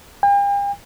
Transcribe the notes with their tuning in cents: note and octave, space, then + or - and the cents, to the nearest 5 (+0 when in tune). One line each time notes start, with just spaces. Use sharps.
G5 +45